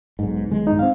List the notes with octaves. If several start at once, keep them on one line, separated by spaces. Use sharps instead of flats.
B1 G#2
B1 D#3 G#3
G2 D#4
C4 F5